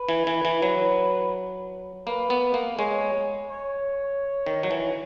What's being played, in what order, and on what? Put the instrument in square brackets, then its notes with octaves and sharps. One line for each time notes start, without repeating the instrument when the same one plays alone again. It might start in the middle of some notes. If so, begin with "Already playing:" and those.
Already playing: [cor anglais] B4
[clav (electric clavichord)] E3
E3
E3
F#3
[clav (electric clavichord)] A#3 [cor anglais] B4
[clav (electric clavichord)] B3
A#3
[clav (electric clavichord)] G#3 [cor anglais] C#5
[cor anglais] C#5
[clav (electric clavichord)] D#3
F#3
E3